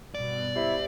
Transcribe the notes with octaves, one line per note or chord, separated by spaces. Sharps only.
G2 B2 B3 D5
E4 G4 C5 E5